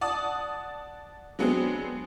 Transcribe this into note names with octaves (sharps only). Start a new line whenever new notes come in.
D5 F#5 A5 D#6
F#3 G#3 B3 C4 D4 G#4